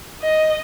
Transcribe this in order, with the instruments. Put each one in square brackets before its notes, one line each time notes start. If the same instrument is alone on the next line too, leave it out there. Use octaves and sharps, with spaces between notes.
[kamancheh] D#5